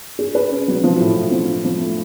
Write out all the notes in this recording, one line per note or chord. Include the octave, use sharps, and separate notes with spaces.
G#4
B4
C#4
F#3
F3
A2
A2
F3
D4
F3
A3